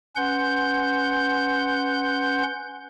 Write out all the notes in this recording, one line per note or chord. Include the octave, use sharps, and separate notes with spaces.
C#4 B4 F#5 C6 G6